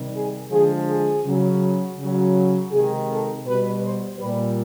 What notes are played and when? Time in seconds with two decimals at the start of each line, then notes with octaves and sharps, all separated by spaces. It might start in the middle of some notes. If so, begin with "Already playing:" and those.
Already playing: C3 D#3 G3
0.14 G#4
0.51 D3 F3 G#3 G#4
0.88 G#4
1.25 C#3 F#3
1.98 C#3
2.03 F#3
2.72 C3 D#3 G#3 G#4
3.08 A4
3.45 B2 G3 B4
3.83 C5
4.19 A#2 G3 B4